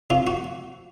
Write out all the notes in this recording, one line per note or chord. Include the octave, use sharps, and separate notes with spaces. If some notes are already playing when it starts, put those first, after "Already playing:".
C3 F4
F#4